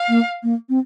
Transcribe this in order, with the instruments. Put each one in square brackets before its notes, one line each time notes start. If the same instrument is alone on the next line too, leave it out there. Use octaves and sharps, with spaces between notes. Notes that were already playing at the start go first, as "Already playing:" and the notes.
Already playing: [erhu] F5
[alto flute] A#3
A#3
C4